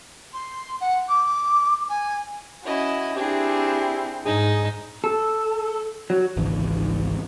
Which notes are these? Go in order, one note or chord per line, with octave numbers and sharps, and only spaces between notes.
C6
F#5
D6
G#5
C#4 E4 F#4 D#5
C4 D4 E4 G4 G#4
G#2 D#4 G#4
A4
F#3
G#1 C#2 D#3 E3